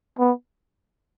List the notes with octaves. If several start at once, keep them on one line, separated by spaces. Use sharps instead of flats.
B3